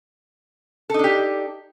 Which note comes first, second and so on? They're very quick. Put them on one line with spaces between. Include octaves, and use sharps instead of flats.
A4 D#4 D4 G4